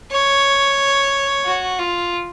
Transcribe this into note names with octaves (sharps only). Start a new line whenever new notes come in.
C#5
F#4
F4